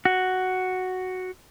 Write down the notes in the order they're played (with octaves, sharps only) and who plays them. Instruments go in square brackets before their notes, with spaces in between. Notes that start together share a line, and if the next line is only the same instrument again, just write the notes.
[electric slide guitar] F#4